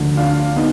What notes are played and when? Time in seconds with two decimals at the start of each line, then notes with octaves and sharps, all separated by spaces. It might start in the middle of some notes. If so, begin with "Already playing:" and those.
Already playing: D2 D3 F3
0.17 D4 F4
0.56 B3 D#4